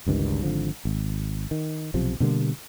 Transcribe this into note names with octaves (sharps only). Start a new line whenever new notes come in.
G1 C#2 G2 D#3
G#1 D3 F3
G#1
D#3
B1 C3 F3
B2 D3 G3 A#3